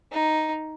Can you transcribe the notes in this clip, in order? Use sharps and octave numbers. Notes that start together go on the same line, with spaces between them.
D#4